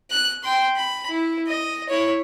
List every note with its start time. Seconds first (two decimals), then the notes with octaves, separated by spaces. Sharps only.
0.11 F#6
0.43 G5 C6
0.76 B5
1.09 E4
1.47 D#5
1.89 E4 C#5